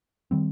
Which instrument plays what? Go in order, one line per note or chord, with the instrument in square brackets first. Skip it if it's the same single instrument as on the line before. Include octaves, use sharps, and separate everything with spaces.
[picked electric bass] D#3 G3 C4